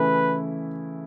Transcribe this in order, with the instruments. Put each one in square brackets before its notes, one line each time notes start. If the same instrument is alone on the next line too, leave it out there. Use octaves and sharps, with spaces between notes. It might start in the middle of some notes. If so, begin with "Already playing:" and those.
Already playing: [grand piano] C#3 E3 A3 E4 [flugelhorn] B4